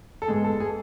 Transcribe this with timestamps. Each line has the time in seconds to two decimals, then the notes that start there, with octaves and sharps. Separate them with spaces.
0.22 A4
0.28 G#2 G#3 B3 G#4
0.44 A4
0.60 G#4